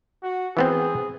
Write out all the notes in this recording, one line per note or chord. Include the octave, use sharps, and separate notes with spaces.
F#4
E3 B3 C4 G#4